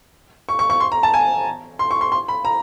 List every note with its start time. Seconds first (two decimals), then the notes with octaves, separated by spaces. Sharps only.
0.49 C#6
0.59 C#6
0.70 C#6
0.80 C6
0.92 A#5
1.03 A5
1.14 G#5
1.79 C6
1.91 C#6
2.01 C6
2.12 C6
2.28 B5
2.45 A#5